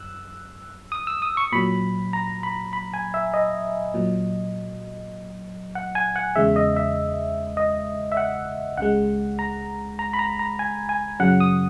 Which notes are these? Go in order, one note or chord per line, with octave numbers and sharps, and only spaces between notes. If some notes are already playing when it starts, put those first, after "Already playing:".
Already playing: F#2 E6 F#6
D#6
E6
D#6
C#6
A#2 F#3 B5
A#5
B5
B5
G#5
E5
D#5
A#2 F#3
F#5
G#5
F#5
E2 C#3 G#3 E5
D#5
E5
D#5
E5
F#5
C#2 C#3 G#3 F#5
A#5
A#5
B5
A#5
A#5
G#5
G#5
F#2 C#3 F#3 F#5
D#6